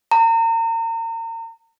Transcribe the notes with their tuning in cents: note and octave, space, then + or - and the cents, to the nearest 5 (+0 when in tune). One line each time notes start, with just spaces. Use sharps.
A#5 -35